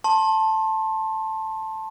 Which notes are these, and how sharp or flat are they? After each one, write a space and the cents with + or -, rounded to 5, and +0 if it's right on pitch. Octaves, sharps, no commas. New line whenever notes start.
A5 +0 C6 +30